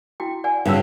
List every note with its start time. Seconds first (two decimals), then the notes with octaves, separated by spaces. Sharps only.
0.20 E4 F#4 G5
0.44 D5 F#5 G#5
0.65 G2 C#3 F#3 F5 E6